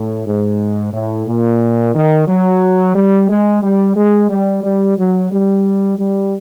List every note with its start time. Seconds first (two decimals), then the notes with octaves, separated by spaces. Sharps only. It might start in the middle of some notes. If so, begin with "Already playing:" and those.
Already playing: A2
0.27 G#2
0.93 A2
1.27 A#2
1.95 D#3
2.28 F#3
2.95 G3
3.29 G#3
3.63 G3
3.97 G#3
4.30 G3
4.64 G3
4.98 F#3
5.31 G3
5.98 G3